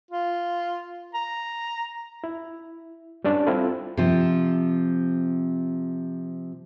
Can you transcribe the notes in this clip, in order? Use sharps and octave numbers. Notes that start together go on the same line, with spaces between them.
F4
A#5
E4
G3 C#4 D4 D5
C4 E4 F4 A4
C3 F3